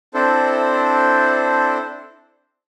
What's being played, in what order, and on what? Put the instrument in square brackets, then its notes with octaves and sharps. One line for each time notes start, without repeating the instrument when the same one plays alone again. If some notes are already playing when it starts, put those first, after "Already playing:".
[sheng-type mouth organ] C4 D4 E4 A4 C5